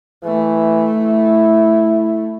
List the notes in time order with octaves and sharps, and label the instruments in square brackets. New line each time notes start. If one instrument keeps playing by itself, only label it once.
[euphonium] E3 [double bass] A3
[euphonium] E4